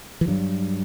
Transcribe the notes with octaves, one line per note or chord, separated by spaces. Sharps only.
E3
G2 F#3